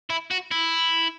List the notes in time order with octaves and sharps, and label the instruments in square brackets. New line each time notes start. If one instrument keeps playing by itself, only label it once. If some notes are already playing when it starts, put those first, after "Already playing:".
[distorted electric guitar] E4
F#4
E4